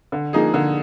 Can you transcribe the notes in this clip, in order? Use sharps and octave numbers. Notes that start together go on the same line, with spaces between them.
D3
F3 A#3 D#4 G#4
D3